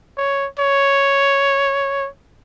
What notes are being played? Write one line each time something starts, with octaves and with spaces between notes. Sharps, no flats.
C#5
C#5